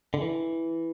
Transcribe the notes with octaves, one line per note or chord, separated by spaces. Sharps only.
D3
E3